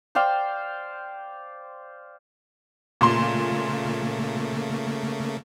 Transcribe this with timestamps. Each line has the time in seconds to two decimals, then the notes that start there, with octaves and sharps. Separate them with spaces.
0.15 C5 D5 F5 G5
3.01 A#2 C#3 A3 A#3 C6